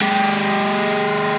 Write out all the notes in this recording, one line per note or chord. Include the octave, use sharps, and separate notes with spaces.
G#3 G4